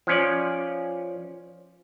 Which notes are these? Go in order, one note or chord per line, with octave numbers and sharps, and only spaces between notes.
F3 C#4 D5